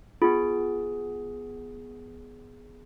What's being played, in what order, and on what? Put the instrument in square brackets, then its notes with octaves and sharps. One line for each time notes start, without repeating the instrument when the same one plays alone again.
[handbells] B3 G#4 [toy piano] F4